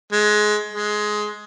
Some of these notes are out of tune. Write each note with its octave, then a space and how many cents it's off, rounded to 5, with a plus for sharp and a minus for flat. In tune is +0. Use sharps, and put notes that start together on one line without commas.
G#3 +20
G#3 +15